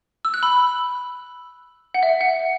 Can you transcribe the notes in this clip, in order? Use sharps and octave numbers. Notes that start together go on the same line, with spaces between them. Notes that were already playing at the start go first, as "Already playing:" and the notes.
E6
F#6
B5 E6
F#5
E5
F#5